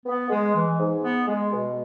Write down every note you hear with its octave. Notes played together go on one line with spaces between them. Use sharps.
B3
G#3
E3
G#2
B3
G#3
B2